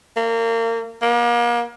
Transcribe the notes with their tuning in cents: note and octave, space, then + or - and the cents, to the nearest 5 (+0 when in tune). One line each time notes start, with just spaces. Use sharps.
A#3 -30
A#3 +35